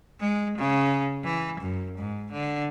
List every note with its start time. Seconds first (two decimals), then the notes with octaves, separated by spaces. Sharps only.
0.20 G#3
0.58 C#3
1.24 E3
1.60 F#2
1.98 G#2
2.32 D3